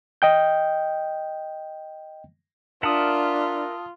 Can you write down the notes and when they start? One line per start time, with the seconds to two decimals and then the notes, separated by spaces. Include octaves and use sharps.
0.22 D#5 G5 G6
2.83 D4 F4 A#4 E5 F#5 A5 D#6